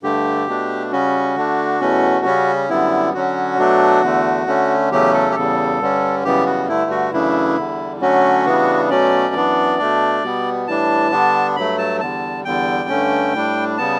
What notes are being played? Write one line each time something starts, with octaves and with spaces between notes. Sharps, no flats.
G2 D3 A3 G4
B2 A3 D4
C#3 G3 C#4 F#4
D3 A3 D4
E2 B2 A3 C#4
C#3 G3 C#4
F#2 D3 G3 B3 E4
D3 F#3 C#4 F#4
B2 F#3 A3 D4
E2 D3 A3
D3 A3 C#4
E2 C#3 F#3 A3 C#4 G4
A4
G4
E2 C#3 G3 A4
G2 D3 G3 C#4
F#2 C#3 E3 G3 B3 G4
F#4
G2 D3 A3 E4
F#4
F#2 C#3 E3 A3 D4 E4
E2 D3 G3
D3 F#3 A3 C#4 F#4
C#3 E3 G3 B3 D4
B2 F#3 A3 C#4 D5
F#2 E3 B3 D4
B2 A3 D4
B2 G3 B3
A2 E3 G3 D4 A5
D3 G3 B3 D4
G2 F#3 A3 B5
A5
E2 D3 G3 A5
E2 D3 G3 G5
G2 D3 A3 C#4
A2 G3 D4
C#3 G3 B3 A5